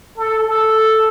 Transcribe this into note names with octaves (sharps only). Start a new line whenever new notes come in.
A4
A4